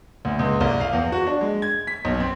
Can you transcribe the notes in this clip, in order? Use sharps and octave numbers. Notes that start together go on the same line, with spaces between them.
D2
C#2
C2
F5
E2
F#4
D4
G#3
G#6
B6
B1
C4